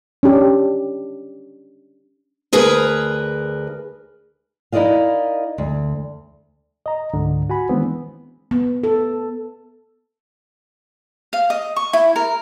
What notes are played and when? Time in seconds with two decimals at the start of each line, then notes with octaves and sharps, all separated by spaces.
0.23 C#4 D4 G4
2.53 D2 G#4 A#4 B4
4.72 D#4 E4 A#4 D5 D#5 F5
5.58 D2
6.86 D#5 A#5
7.14 C#2 G#2 D3
7.50 F#4 G#5 B5
7.69 D#3 E3 G#3 B3 C4 D4
8.51 B3
8.84 A4
11.33 F5
11.50 D#5
11.76 C#6
11.93 E4
12.16 A#4